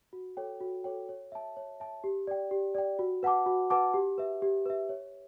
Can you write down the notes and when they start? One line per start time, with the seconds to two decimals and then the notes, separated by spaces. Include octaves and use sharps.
0.13 F#4
0.37 A4 C#5 G5
0.60 F#4
0.84 A4 C#5 G5
1.09 C#5
1.32 E5 A5
1.57 C#5
1.80 E5 A5
2.04 G4
2.27 D5 G5
2.51 G4
2.75 D5 G5
2.99 F#4
3.23 B4 F#5 A5 D6
3.46 F#4
3.70 B4 F#5 A5 D6
3.94 G4
4.18 B4 E5
4.42 G4
4.66 B4 E5
4.89 C#5